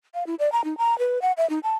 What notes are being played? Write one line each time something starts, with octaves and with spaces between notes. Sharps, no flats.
F5
E4
D5
A#5
D#4
A#5
B4
F#5
E5
D#4
A5